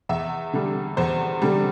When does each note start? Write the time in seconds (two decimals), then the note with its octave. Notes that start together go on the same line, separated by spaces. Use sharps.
0.09 E2 E5
0.53 D3 G3
0.97 E2 C5
1.42 D3 G3